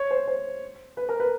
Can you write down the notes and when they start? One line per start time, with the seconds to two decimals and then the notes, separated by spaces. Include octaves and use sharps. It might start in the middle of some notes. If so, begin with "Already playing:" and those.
Already playing: C#5
0.11 C5
0.28 C5
0.97 B4
1.09 A#4
1.20 B4